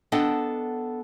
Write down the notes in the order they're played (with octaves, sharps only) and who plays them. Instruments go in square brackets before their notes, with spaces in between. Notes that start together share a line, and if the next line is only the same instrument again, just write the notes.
[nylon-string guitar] B3 D4 A4 D#5 F#5 G5